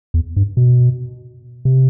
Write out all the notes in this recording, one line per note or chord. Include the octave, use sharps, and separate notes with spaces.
E2
G2
B2
C3